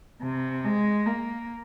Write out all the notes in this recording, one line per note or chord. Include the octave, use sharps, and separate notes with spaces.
C3
G#3
A#3